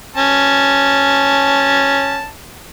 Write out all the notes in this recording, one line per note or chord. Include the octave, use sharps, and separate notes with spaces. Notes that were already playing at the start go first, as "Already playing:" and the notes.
C#4 A5